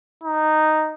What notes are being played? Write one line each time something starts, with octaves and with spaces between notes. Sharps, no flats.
D#4